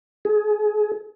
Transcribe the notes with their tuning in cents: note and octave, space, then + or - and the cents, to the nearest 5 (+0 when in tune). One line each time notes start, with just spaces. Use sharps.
G#4 +30